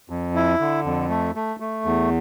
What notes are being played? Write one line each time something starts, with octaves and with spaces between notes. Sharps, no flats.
F2
E4
D3
F2
A3
A3
A3
E2